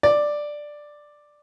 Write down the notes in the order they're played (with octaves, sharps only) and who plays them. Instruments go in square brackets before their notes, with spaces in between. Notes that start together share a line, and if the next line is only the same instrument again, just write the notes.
[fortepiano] D5